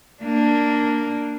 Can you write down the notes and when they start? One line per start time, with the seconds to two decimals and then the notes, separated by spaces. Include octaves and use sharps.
0.22 A#3 D4